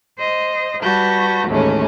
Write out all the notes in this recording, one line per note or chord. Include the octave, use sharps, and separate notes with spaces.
C5 D#5
G3 F#4 B4 A5 G6 A#6
D#2 A2 E3 G#3 A3 C#4